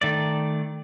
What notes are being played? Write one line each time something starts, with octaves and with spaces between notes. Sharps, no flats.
D#3 A3 D5